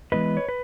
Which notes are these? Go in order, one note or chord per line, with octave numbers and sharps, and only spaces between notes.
E3 G#3 B3 E4 B4 D#5
C#5
B4